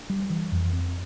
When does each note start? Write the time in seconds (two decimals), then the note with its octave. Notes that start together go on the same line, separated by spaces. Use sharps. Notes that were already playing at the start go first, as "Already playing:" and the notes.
Already playing: D4
0.10 G3
0.30 E3
0.52 F2
0.73 C4